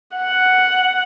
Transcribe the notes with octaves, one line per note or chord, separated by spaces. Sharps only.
F#5